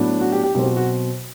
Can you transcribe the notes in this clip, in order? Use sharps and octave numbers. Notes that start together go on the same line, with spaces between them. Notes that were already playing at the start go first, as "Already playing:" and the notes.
Already playing: A2 F#3 B3 D4
F#4
G4
G4
B2 F#3 C4 G4
F#4
F#4